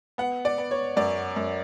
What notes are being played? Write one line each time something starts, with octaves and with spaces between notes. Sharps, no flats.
B3 F#5
D5
B3
C#5
F#2 D5
F#2